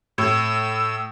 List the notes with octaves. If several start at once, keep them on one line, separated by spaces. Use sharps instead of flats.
A2 E6